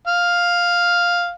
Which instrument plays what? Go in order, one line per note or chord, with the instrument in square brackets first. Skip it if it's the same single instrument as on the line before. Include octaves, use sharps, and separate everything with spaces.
[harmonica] F5